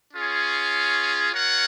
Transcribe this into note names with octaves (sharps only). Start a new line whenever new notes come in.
C#4 F4 G#4 C#5
F4 A#4 C#5 F#5